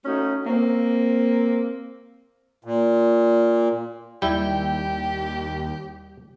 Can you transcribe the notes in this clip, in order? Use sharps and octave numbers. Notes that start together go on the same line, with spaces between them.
A3 C#4 D#4 F#4
A#3 C4
A#2
D#2 G3 E4 G4 G5